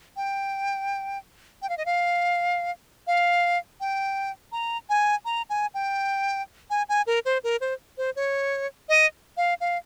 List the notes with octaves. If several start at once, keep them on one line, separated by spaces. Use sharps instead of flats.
G5
G5
F5
D#5
F5
F5
G5
A#5
G#5
A#5
G#5
G5
G#5
G#5
A#4
C5
A#4
C5
C5
C#5
D#5
F5
F5